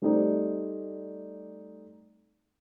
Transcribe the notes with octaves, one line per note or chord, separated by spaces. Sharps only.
G3 A3 C4 D#4 D5